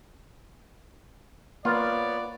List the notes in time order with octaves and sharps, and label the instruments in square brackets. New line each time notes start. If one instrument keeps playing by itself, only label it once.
[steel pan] A#3 [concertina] B3 B4 C#5 [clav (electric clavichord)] F4 [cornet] D5